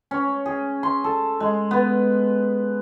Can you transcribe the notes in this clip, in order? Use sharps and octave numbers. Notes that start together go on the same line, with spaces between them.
C#4
G#4
C6
A4
G#3
B3